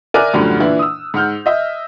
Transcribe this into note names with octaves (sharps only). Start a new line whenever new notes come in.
A#4 D5 E5 G#5 F6 F#6
F#2 A2 D3 F3 G3
A#2 E3 D4 E4
D#6 E6
G#2 F#5 F6 G6
D#5 E5